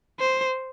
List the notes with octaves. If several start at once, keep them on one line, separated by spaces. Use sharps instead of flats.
C5